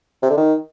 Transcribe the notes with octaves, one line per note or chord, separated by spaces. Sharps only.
C3
D3
D#3